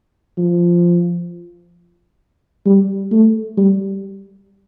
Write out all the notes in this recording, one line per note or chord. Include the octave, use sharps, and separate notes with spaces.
F3
G3
A3
G3